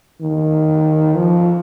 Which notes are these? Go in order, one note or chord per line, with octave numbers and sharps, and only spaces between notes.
D#3
F3